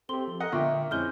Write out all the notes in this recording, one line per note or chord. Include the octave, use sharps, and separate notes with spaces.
C4 G4 A4 C6 G7
F3
A#4 D#5 F#5
A#2 D3 A#3 E5 G5 C#6 D6
F2 G#3 C4 C#4 E4 F6 G6 G7